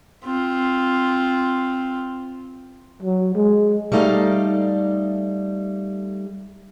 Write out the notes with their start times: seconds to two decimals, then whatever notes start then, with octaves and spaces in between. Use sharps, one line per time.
0.24 C4 F4
3.02 F#3
3.35 G#3
3.92 G3 A3 D#4 A4 F5